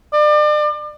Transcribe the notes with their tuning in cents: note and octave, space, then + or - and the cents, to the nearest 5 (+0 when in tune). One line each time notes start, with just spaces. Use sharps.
D5 +35